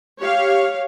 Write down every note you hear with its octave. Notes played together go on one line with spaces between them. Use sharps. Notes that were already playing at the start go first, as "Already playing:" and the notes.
G4 C#5 F5